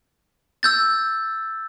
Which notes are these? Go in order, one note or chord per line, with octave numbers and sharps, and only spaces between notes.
E6 G6 A6